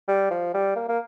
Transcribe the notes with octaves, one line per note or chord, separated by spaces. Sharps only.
G3
F3
G3
A#3
A#3